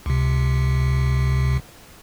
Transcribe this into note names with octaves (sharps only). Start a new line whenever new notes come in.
C#2 C3